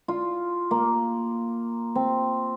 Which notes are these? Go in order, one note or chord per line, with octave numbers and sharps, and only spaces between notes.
F4
A#3
C4